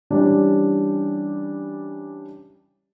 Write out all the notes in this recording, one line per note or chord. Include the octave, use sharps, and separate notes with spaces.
E3 G3 C#4 D4 G4 D5